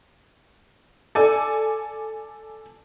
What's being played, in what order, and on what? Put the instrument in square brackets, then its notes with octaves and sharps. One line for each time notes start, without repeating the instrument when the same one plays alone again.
[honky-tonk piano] A4 D5 G#5